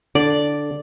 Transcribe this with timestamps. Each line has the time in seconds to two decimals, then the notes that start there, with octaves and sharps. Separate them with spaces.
0.15 D3 D5